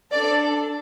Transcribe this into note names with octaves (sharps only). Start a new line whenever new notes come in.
D4 A4 D5